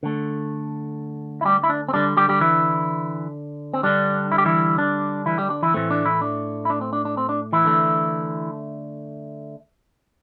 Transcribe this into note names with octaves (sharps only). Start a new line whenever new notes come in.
D3 A3
E4
G3 G4
E4
D4
C4
D3 G3 D4
G3 G4
G3 G4
E3 E4
C4
D3 G3 D4
E4
G4
E3 E4
D4
E3 E4
G3 G4
D4
E3 E4
A2 E3 A3 C4
D4
E3 E4
D4
E4
D4
C4
D4
D4
C4
D4
E3 E4
D3 A3